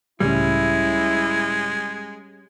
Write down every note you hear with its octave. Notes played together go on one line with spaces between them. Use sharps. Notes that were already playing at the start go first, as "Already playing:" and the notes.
C#2 A2 G3 G#3 C#4 E4